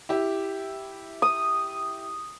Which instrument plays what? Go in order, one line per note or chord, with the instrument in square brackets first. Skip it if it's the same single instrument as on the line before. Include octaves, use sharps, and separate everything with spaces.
[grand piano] E4 G4
[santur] D#6